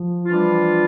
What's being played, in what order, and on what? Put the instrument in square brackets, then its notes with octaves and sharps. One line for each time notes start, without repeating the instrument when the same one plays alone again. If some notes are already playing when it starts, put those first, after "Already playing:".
Already playing: [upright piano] F3
[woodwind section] E3 G3 D4 F4